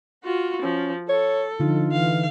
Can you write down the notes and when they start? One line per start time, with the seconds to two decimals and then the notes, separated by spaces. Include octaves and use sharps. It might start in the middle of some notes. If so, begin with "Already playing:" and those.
0.24 F4 F#4
0.62 F3 C#4
1.09 A4 C#5
1.60 D3 F3 D#4 F4
1.92 E3 F5